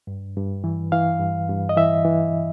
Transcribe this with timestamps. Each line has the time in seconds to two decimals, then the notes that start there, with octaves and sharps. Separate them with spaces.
0.07 G2
0.37 G2
0.64 E3
0.92 E3 F5
1.20 G2
1.49 G2
1.69 D#5
1.77 E3 E5
2.05 E3